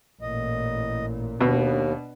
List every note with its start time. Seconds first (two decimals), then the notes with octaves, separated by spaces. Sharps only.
0.22 A1 A#2 D#5
1.41 D#2 B2 B3 D4